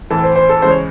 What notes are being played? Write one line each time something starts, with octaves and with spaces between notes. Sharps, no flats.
A2 E3 C4 A4
C5
C5
A4
C#3 E3 G#3 C5
C#5